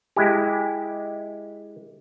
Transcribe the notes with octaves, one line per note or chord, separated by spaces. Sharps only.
G#3 E4 G4